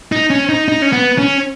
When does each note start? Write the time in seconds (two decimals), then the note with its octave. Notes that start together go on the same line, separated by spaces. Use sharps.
0.12 D#4
0.30 C#4
0.49 D#4
0.68 D#4
0.82 C#4
0.93 B3
1.18 C#4